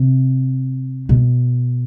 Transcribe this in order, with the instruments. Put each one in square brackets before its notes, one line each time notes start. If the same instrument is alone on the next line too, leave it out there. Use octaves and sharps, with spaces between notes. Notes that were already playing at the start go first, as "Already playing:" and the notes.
Already playing: [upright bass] C3
B2